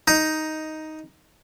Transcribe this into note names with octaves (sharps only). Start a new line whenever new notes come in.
D#4